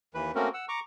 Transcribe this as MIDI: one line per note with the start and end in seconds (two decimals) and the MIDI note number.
0.15 0.32 39
0.15 0.32 52
0.15 0.32 71
0.35 0.49 57
0.35 0.49 58
0.35 0.49 60
0.35 0.49 61
0.35 0.49 66
0.35 0.49 70
0.54 0.66 78
0.54 0.66 88
0.69 0.80 82
0.69 0.80 85
0.69 0.80 86